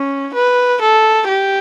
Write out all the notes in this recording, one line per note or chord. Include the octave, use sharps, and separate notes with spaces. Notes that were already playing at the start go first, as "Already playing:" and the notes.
Already playing: C#4
B4
A4
G4